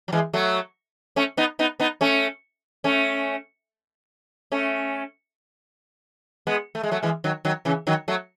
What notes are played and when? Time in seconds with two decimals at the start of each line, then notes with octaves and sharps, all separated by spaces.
0.08 F#3
0.12 E3 G#3
0.33 F#3 A3
1.16 A3 C#4
1.37 B3 D#4
1.59 B3 D#4
1.80 B3 D#4
2.01 A3 C#4
2.84 A3 C#4
4.52 A3 C#4
6.47 G#3 B3
6.75 A3
6.83 G#3
6.91 F#3 A3
7.03 E3 G#3
7.24 D#3 F#3
7.45 D#3 F#3
7.65 C#3 E3
7.87 D#3 F#3
8.08 F#3 A3